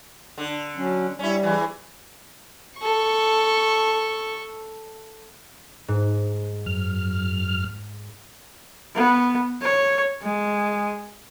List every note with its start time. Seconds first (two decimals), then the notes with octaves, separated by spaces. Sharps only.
0.38 D3
0.77 F#3 C#4
1.19 G3 C#4 E4
1.43 E2 E3
2.79 A4 C#6
5.88 G#2
6.66 F#2 F6
8.96 B3
9.62 C#5
10.22 G#3